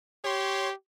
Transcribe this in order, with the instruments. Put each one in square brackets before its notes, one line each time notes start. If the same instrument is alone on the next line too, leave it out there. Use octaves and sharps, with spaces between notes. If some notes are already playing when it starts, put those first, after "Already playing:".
[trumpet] G4 [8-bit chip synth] C#5 C6